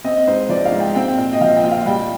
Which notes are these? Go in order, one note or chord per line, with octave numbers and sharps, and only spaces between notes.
C4 D#5
G#2 C5
F3 D5
F5
G#2
G5
C4 G5
A#2
D#5
F3 F5
G5
A#2
F5
G3 G5